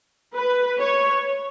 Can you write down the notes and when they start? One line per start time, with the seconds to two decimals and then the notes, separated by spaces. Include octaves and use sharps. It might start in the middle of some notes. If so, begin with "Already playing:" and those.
0.36 B4
0.79 C#5